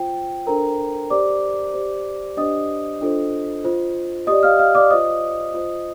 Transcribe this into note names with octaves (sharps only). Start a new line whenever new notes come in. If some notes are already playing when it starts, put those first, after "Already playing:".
Already playing: F4 C5 G5
D4 A4 A#4 C5 A#5
G4 C5 D5 D6
G4 C5
D4 G4 C5 D#5 D#6
D4 F4 A4 C5
F4 C5
G4 D5 D#5 D#6
F5 F6
F5 F6
D5 D6
F4 C5 D#5 D#6
F4 C5